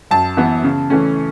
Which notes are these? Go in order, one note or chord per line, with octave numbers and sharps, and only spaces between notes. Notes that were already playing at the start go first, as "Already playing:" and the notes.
F#2 A5
E3 B3
C#3
E3 A3 C#4